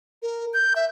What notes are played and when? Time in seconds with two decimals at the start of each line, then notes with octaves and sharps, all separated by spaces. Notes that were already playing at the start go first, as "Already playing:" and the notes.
0.22 A#4
0.54 G6
0.76 E5